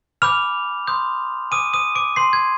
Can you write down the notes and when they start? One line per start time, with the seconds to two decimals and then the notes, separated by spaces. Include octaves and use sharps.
0.22 G#5 B5 D6 F6 G6 F7
0.87 C6 D#6 G6
1.51 G#5 D6 D#6 F6 D#7
1.73 D#6 D#7
1.95 D6 D7
2.16 G#5 C6 D6 G6 C7
2.33 G#6